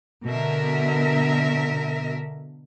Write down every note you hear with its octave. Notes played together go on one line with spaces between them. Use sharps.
B2 D3 A#4 E5